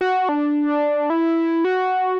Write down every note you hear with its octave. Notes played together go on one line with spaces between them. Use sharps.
F#4
D4
E4
F#4